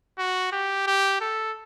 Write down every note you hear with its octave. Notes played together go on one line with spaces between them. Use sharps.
F#4
G4
G4
A4